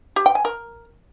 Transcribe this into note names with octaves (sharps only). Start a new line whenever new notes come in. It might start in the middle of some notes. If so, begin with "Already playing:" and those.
G4
G5
G#5
A#4